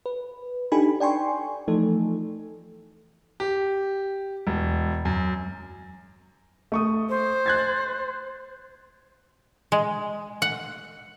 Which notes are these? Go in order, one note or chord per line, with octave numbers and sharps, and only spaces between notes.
B4
D4 D#4 G4 A4 G#5 B5
D5 G5 G#5 C6 C#6
E3 F3 A3 D#4 A4
G4
E1
F#2
A3 C#6 D#6
C5
F#6 G#6 A6
G#3
F#5